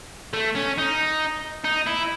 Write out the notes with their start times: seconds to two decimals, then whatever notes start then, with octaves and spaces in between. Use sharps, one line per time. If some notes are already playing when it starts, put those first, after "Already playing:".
0.33 A3
0.55 C#4
0.78 D#4
1.65 D#4
1.87 E4